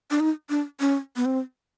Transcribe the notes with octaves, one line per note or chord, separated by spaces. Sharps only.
D4
D#4
D4
C#4
B3
C4